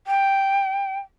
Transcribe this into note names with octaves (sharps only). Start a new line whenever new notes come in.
G5